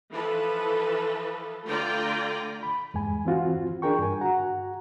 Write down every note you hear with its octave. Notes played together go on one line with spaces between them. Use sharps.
E3 F3 A4 B4
D3 A3 F4 D5 G5 A#5
B5
E2 G2 G#3 G#5
E3 C4 F4 F#4
D4 G#4 A#4 G5 C#6
G2 G#5
F#4 F#5 A#5